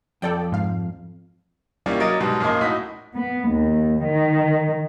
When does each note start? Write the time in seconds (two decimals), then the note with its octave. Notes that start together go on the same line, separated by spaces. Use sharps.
0.22 F2 A4 D5 G5
0.52 G#2 F5
1.86 D#3 G3 A#3 C#4 D4 E4
2.00 F#3 D4 A#4 D#5 A6 D7
2.20 G#2 B2 F#3 G3
2.40 F#2 A#2 F3 A#3 D#4
2.61 A2 D#4 E4 F#4 B6
3.16 B3
3.49 D#2
4.04 D#3